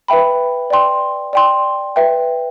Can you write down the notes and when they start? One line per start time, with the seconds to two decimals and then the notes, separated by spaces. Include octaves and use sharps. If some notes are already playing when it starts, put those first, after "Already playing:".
0.08 B4 E5 G5 B5
0.70 D5 G5 C6
1.33 D5 G5 C6
1.96 B4 E5 G5